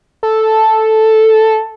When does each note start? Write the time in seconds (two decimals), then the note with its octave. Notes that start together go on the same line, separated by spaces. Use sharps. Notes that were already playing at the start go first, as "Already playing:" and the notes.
0.23 A4